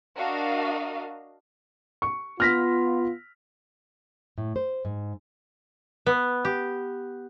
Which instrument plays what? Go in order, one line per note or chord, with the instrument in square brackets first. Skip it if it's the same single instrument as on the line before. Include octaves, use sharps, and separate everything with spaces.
[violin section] D4 F#4 A#4 D#5 F5
[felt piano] C#6
[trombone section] B3 F4 [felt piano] F6 A#6 B6
[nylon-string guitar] A2
C5
G#2
[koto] B3
G4